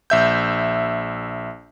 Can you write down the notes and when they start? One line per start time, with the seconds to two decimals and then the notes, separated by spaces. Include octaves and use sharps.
0.10 A#1 E5 G6